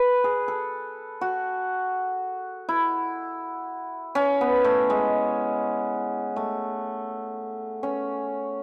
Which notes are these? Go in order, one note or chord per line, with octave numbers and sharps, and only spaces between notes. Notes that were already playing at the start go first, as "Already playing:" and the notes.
Already playing: B4
G#4
A4
F#4
E4
C#4
B3
A3
G#3
A3
C#4